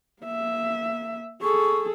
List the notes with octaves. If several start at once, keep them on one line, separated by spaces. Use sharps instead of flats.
A#3 E5
G#4 A4 C#6